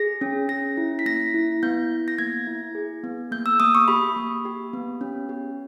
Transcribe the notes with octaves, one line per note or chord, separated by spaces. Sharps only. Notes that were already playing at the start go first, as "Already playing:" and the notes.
Already playing: G#4 A#6
C#4
C#4 A#6
E4
B6
A#3 A#6
E4
B3 G6
B3
A#6
A#3 G#6
E4
G#4
B3
A#3 G6
E6
A#3 D#6
C#6
G4 B5
A#3
G4
B3
C#4
G4